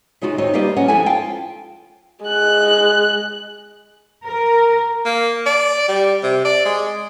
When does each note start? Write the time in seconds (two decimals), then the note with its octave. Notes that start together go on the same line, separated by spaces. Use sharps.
0.21 C#3 G#3 D#4 F4 F#4
0.38 D#2 D#3 C4 C#5 D#5
0.54 G3 A#3 F4 G4 B4 D#5
0.76 G#3 C#4 D#5 F#5
0.88 F3 G#3 B3 E4 A4 G#5
1.06 F4 F5 G5 A5
2.25 G#3 F#6
4.25 A#4
5.06 A#3
5.46 D5
5.88 G3
6.23 C3
6.45 D5
6.65 G#3